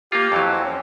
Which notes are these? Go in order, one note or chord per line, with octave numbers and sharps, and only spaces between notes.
A#3 F4 G4
F2 E3 F#3
C4
C#4